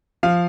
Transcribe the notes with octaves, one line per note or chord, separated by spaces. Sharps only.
F3 F5